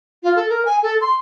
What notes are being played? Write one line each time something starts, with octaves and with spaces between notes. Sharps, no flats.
F4
A4
A#4
G#5
A4
C6